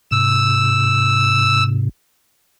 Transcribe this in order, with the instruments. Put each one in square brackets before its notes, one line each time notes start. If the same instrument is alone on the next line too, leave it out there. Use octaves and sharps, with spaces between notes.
[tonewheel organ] G#2 C3 [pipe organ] E6